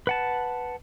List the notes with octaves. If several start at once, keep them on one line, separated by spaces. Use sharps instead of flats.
B4 F#5 A5